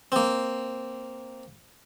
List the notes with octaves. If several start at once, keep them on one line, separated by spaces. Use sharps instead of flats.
A#3 C4